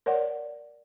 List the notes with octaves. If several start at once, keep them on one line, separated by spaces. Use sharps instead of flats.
A#4 C#5 D5 F#5